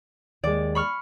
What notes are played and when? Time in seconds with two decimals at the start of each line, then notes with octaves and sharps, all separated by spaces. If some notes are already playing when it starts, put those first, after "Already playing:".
0.44 D#2 G#3 D5
0.75 B5 C#6 F6